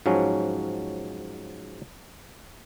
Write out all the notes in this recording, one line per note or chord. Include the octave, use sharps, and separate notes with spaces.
G#2 F3 F#3 C#4